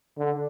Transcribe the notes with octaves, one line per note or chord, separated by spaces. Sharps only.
D3